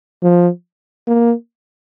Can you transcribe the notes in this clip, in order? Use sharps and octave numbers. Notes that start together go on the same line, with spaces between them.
F3
A#3